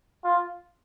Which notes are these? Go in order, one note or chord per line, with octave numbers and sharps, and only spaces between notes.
F4